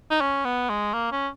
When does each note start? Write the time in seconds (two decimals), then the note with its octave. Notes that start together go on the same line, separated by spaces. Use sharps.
0.11 D#4
0.21 C#4
0.45 B3
0.69 G#3
0.93 A#3
1.12 C#4